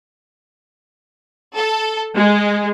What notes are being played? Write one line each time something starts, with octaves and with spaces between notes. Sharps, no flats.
A4
G#3